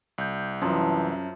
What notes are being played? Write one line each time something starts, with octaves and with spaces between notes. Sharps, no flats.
C2 G6
F#2 E3 F3 E5